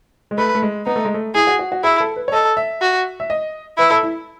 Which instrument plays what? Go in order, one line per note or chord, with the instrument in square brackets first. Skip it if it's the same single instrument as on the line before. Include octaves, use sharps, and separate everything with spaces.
[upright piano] G#3
[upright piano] A3 [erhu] B4
[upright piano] A3
G#3
[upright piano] B3 [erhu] D#4
[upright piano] A3
G#3
A3
[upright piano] E4 [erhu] G#4
[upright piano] F#4
F#4
F#4
[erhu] E4 [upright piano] G#4
[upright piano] A4
B4
C#5
[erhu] A4 [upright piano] D#5
[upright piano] E5
[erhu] F#4
[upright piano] E5
D#5
[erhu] E4 [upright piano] B4
[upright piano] A4
E4